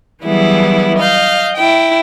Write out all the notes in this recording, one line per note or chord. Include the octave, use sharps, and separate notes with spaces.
E3 F#3 G3 B3 E4 G#4
D#5 F5 G6
E4 G5